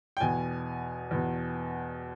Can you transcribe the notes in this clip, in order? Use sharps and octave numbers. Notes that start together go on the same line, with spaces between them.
G5
E2 B2 G#5
E2 B2